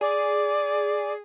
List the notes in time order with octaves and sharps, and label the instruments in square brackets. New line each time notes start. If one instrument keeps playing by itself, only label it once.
[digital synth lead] G#4 [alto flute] D5